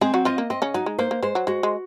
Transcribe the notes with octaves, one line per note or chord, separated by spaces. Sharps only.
G#3 C4 G#4
F#3 F#4
F3 F4 D#5
A#3
C4 D#5
C#3 C#4
F#3 D#4
G#3
A#3 C5
A#3
G#3 C5
F#3
G#3 F#4
G#3